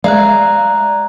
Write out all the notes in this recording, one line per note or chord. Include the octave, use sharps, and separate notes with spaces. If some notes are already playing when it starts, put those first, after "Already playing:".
G#3 D5 E5 F5 A#5 F#6